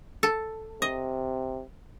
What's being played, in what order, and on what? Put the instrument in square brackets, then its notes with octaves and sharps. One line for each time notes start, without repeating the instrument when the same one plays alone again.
[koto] A4
[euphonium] C3 [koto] D#5